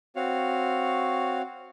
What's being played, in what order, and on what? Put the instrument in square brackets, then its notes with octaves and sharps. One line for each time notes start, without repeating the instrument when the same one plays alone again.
[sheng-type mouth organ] C4 F#4 C#5 F5